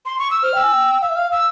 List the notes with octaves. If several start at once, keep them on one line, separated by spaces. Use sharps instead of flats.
C6
C#6
E6
C5 F6
G5 E6
G#5
G5
F5 E6
E5
F5 F6
F5 E6